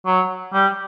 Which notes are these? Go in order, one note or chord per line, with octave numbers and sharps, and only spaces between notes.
F#3
G3